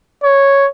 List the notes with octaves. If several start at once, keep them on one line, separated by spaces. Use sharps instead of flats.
C#5